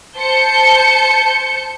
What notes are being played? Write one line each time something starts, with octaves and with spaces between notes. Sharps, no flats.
C5 A5 G6 C#7